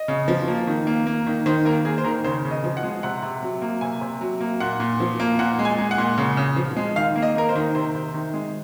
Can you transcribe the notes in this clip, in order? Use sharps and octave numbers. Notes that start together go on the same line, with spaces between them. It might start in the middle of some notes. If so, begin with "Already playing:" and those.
Already playing: D#5
C#3
F3
A#3
D#3
A#3
A#3
D#3
D#3 C5
A#3 A#4
A#3 G#4
C5
D#3 A#4
C#3 C5
C#3
D#5
F3
F#5
G#3
C3 F#5
C3
F#3
A#3
C3 G#5
C3
F#3
A#3
A#2 F#5
A#2
F3
A#3
A#2 F#5
G#3
G#5
G#3
F#5
A#2
C#3
C#3
F3
G#3
D#3 F5
A#3
D#5
A#3 A#4
C5
D#3
C3 C5
C3
D#3
G#3